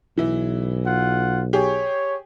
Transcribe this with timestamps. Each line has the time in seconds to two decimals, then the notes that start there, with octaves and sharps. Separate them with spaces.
0.17 B1 E3 E4
0.85 F4 F#5
1.53 G4 G#4 C#5